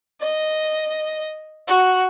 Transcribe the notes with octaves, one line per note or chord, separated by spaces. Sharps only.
D#5
F#4